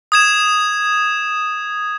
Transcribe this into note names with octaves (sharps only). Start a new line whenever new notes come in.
D#6 G#6 E7